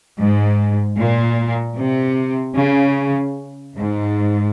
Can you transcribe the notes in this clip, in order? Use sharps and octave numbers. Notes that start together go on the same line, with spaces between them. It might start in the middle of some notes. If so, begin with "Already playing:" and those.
G#2
A#2
C3
C#3
G#2